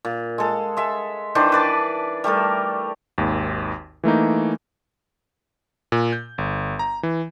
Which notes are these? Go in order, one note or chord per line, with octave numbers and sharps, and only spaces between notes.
A#2
G#3 A4
G#3 E5
D#3 E3 D4 C5
B4 D5 A5
G3 A3 A4 A#4
G#1 D#2
E3 A3 A#3 D#4
A#2
G6
G1
A#5
E3